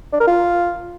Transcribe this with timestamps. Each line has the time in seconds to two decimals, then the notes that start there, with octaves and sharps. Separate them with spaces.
0.13 D4
0.20 A#4
0.28 F4